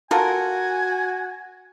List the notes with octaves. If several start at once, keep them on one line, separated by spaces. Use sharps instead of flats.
F4 F#4 A4 A#4 G#5